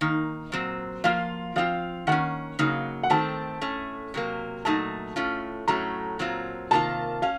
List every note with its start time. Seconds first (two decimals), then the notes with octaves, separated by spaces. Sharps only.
0.01 D#3 A#3 D#4
0.52 A#2 F#3 C4
1.04 F3 A#3 F4 F5
1.56 F3 C4 F4 F5
2.07 D#3 A#3 C#4 F#5
2.59 C#3 F#3 A#3 D#4
3.03 F#5
3.10 D#3 A3 C4 A5
3.61 A2 A3 C#4
4.14 C3 F#3 A#3
4.65 A#2 F#3 A3 D#4 A5
5.16 A2 A3 C#4 F4
5.68 A2 F#3 A3 C#4 A#5
6.19 A#2 F#3 C4 F4
6.71 C3 D#3 A#3 F4 A5
7.22 C#4 F5